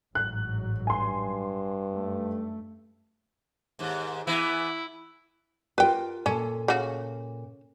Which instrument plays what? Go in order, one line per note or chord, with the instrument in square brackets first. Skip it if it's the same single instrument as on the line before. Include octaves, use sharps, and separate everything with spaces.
[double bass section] A1 G#2 F#3 [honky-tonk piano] F#6
[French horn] G2 [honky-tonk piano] G#5 C6
[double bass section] F#2 A3
[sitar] D#2 G#2
[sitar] E3 B3 [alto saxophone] E4
[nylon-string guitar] F4 G4 A#4 [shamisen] B4 G5
[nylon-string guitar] A#2 A4 A5 [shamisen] C#4
[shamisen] C#3 F#4